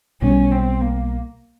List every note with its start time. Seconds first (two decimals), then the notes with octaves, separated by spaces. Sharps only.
0.22 B1 B2 G3 C#4
0.51 C4
0.81 A#3